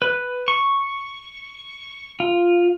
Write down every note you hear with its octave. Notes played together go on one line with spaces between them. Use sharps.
B4
C#6
F4